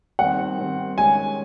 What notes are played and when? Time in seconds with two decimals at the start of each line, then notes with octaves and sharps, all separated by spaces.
0.19 D#3 G3 C4 F#5
0.58 D#3 G3 C4
0.98 D#3 G#3 C#4 G#5